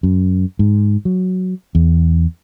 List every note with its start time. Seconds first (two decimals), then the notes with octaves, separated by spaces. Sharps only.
0.03 F#2
0.59 G#2
1.05 F#3
1.75 E2